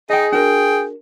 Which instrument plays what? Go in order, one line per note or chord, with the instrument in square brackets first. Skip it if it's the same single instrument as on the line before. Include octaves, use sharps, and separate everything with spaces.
[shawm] D#4 [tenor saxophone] G#4 [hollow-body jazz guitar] D#5 G5
[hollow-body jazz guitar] D4 F#4 A#4 [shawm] G5